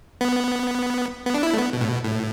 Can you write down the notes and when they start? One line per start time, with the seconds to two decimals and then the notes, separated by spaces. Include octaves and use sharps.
0.21 B3
1.26 B3
1.34 D4
1.43 E4
1.53 A3
1.58 B3
1.73 B2
1.81 A2
1.88 B2
2.04 A2